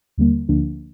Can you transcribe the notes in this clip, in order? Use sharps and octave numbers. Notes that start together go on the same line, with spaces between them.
D#2 D3 G3 A#3
D2 D3 F3 A#3 D4